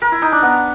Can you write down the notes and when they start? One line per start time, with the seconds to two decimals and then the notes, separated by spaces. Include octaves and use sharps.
0.02 A#4
0.12 E4
0.22 D#4
0.32 D4
0.42 B3